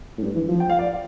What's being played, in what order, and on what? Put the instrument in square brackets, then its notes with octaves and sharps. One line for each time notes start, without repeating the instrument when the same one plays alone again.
[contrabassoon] A2
G2
E3
F3
[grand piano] G5
F5
D5